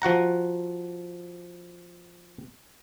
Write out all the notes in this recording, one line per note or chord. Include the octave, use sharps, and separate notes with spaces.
F3 F#4 F#5 A#5